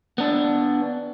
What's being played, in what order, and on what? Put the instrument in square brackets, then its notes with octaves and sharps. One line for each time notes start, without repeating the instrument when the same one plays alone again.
[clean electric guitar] B3 D4